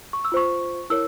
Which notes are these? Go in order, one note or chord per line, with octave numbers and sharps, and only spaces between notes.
C#6
E6
F4 C5 C#6
E4 A#4 C#5 E6